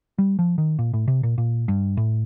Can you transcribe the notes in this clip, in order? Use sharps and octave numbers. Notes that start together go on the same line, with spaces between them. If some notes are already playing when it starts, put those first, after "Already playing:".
G3
F3
D#3
A#2
A2
C3
A#2
A#2
G2
A2